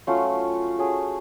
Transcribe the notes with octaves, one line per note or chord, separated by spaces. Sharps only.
F#3 A3 C#4 F4
F#3 A3 C#4 G#4